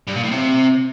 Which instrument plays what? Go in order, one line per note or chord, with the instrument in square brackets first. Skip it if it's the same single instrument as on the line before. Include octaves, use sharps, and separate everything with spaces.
[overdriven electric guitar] G2
A#2
A2
C3